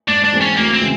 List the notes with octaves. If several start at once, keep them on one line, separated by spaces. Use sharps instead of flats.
G#2 D4
D4
E3 G#3 C4
C#4
D2 A#3
C4
C#3 E3 G#3